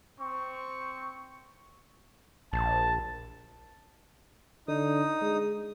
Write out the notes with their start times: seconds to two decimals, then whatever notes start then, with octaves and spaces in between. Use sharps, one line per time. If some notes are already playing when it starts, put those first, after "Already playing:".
0.19 C4 C#6
2.53 A#1 A5
4.68 D3 D#4 D#6
5.22 G#3